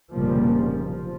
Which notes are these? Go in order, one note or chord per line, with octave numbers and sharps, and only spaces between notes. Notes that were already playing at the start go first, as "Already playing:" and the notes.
F1 A#2 C#3 F3 G3 A#3
F3